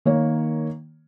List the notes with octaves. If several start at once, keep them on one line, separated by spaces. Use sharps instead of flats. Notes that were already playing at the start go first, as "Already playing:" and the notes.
D#3 A#3 C#5